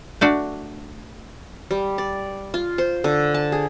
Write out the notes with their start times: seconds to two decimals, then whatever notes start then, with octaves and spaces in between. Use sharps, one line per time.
0.21 A3 D4 F#4
1.71 G3
1.98 D5
2.54 F4
2.78 C5
3.04 D3
3.34 A5
3.52 G#4